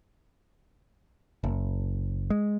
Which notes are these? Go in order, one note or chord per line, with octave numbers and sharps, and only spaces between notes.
F#1
G#3